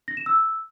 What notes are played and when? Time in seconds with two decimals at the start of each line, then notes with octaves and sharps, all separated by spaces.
0.08 A#6
0.17 E7
0.26 E6